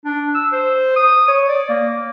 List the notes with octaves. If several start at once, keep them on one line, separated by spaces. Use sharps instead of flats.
D4
E6
C5
D#6
C#5
D5
A#3